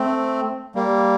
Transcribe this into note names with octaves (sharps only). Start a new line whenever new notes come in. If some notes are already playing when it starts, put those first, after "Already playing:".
Already playing: A3 C4
G3 A#3